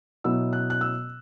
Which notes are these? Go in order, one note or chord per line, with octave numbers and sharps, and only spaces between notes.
B2 F#3 B3 E4 E6
F#6
F#6
E6